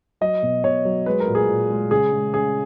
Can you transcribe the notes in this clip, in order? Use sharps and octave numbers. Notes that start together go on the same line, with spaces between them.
F#3 D#5
B2
B2 C#5
F#3
G#3 B4
A#4
A#2
G#4
A#2
G#3
C#3 G#4
G#3
C#3 G#4